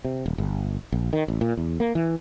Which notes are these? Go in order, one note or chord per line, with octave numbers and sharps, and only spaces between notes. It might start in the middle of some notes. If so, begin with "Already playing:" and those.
C3
D#1
G1
A#1
D#3
A1
A#2
E2
A#3
E3